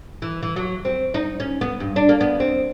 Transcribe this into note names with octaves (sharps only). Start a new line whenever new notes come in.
E3
E3
F#3
C4
D#4
C#4
B3
G2
D4
A#3
B3
C4